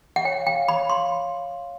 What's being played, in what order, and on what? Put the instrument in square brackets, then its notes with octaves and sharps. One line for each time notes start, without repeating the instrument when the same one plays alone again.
[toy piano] F#5
[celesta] C#5 [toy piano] G5
[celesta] F5
[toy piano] G5
[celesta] F5
[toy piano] B5
[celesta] C#5
[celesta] F5 [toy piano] C6